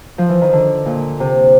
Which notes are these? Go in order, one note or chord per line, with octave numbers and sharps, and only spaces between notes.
F3
E3
D#3
D3
A#2
C3